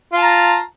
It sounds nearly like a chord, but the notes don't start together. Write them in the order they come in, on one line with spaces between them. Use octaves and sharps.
F4 A5 A#5